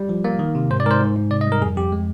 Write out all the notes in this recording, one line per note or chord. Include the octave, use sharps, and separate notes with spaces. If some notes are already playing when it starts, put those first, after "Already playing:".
Already playing: G3
F3
A#3
D#3
C3
G#2 C5
D5
G#2 A#4
C5
G#2
G#2
C3 D5
D#5
G3
A#4
F2 G#4
F2 G4
G#3